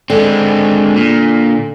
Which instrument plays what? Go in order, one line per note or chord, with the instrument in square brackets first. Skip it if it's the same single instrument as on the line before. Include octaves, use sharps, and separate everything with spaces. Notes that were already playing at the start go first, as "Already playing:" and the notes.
[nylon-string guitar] D3 [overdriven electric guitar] G#3 C4
[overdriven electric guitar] A#2